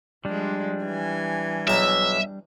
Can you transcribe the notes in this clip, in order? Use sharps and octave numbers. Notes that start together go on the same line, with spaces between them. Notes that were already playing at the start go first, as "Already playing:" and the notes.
F3 G3 G#3 D4
E3 G#5
B1 E5 A#5